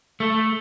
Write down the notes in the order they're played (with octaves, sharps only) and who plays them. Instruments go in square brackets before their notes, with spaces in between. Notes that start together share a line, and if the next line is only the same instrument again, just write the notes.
[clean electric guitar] A3